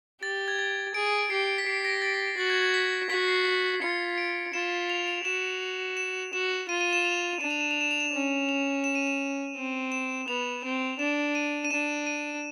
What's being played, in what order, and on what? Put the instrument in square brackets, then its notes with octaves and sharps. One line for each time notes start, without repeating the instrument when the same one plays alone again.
[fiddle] G4 [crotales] A6
[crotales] G#6
A6
[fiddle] G#4 [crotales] D7
[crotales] D7
D7
[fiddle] G4 [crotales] C7
[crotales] B6
[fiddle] G4 [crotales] C7
[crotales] A#6
A6
B6
[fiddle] F#4 [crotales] A6
[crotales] G#6
G#6
B6
[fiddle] F#4 [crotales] B6
[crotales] C7
[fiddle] F4 [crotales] C#7
[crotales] D7
[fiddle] F4 [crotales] E7
[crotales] F7
F7
[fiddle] F#4 [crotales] E7
[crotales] E7
[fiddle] F#4 [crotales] E7
[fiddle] F4 [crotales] D#7
[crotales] D#7
E7
F7
[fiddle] D4 [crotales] E7
[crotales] F7
E7
F7
E7
F7
E7
[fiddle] C#4
[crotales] F7
E7
D#7
E7
[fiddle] C4
[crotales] E7
[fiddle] B3 [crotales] F7
[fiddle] C4
[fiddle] D4 [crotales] E7
[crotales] D#7
D#7
[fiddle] D4 [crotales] E7
[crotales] D#7